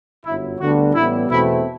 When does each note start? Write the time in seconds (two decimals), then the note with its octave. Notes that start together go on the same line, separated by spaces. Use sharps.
0.24 G1 F#2 F#3 E4
0.60 D2 D3 G3 B3 D4 F#4
0.94 A1 A2 G3 B3 E4
1.29 E2 B2 A3 C4 E4